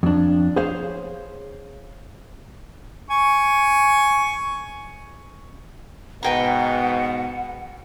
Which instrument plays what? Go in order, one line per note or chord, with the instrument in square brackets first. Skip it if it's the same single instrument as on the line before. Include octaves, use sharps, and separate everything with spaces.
[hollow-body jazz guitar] F2 D4
G#4 C5 C#5 F5
[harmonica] G#5 C#6
[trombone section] G#2 B2 [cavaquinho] B4 G5 A#5 [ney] F#5